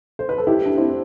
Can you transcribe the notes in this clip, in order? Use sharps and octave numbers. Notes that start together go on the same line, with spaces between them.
C5
B4
A4
E4 G4
D4
C4 E4